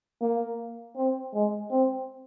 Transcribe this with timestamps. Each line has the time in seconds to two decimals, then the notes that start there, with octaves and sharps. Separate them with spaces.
0.21 A#3
0.96 C4
1.34 G#3
1.70 C4